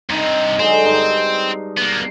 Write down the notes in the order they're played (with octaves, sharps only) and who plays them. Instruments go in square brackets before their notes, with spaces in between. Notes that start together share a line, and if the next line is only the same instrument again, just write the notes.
[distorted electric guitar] G2 C3 [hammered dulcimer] D#4
[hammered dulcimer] D3 F#3 G#3 [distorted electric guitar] C4
[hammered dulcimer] G2 D#4 C6
[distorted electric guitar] A#3 B3